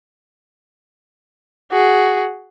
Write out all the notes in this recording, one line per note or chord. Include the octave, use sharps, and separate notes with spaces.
F#4 G#4